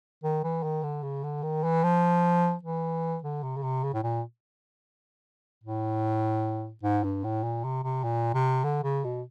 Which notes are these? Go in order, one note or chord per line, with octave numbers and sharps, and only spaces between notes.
D#3
E3
D#3
D3
C#3
D3
D#3
E3
F3
E3
D3
C3
C#3
C3
C#3
A2
A#2
A2
G#2
G2
A2
A#2
C3
C3
A#2
C3
D3
C#3
B2